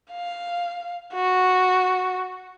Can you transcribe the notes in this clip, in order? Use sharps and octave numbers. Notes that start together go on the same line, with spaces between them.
F5
F#4